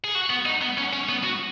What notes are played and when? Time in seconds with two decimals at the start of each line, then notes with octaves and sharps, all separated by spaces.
0.04 G#4
0.15 F#4
0.30 B3
0.46 D#4
0.62 B3
0.77 C#4
0.93 C#4
1.09 B3
1.24 F#4